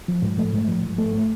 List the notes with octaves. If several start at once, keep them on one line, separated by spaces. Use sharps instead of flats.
F3
G#2
A3
G#2
F3
G#2
A3